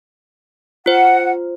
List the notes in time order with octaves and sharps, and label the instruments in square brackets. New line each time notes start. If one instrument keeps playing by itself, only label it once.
[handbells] F4 C5 [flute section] F#5